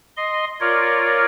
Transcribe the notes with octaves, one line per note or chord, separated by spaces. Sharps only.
D#5 C6
F4 A#4 C#5 D5